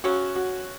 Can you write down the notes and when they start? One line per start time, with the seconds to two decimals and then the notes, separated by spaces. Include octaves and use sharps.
0.04 C#3 F#3 C#4 F#4
0.36 F#4